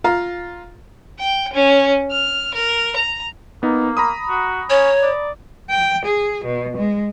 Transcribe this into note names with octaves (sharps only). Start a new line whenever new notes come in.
F4 F5 A#5
G5
C#4
F6
A#4
A#5
A#3 B3 D#4
A#5 B5 D#6
F#4
C#4 C#5
D5
G5
G#4
B2
G#3